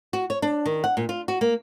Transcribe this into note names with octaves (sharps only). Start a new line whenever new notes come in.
F#4
C#5
D4
D#3
F#5
A#2
F4
F#4
A#3